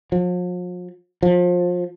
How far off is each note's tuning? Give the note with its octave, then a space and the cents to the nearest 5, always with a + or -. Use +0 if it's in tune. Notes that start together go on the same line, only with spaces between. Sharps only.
F3 +45
F3 +30